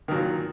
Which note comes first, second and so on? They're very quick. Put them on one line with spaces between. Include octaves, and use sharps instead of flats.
D#3 F#3 A#2